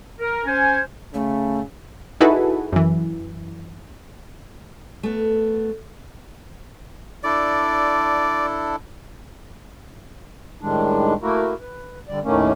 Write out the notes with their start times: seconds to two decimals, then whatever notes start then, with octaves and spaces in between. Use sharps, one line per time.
0.20 A#4
0.45 C#4 C5 G#5
1.14 C#3 A3
2.21 D#4 E4 F#4 G#4 A4 B4
2.72 F#2 E3
5.03 A3 B3
7.23 D4 E4 A4 D5
10.61 A2 D#3 G3 G#3 D4
11.22 A3 A#3 E4 F#4 A#4
11.61 B4
12.08 D3 G3 D5
12.24 D#2 A2 D#3 A3 A#3 C#4